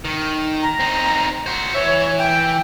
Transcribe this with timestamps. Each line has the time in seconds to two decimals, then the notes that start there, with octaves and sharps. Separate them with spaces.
0.05 D#3
0.63 A#5
0.80 C4 D#4
1.46 F#4 C5
1.74 E3 C#5 E5
2.19 G5